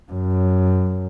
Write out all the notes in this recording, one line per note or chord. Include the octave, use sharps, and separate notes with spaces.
F#2